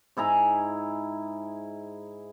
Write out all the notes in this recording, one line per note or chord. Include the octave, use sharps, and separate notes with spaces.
G#2 E4 G#4 A#5